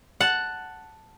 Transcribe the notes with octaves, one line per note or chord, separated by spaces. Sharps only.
F#5 A5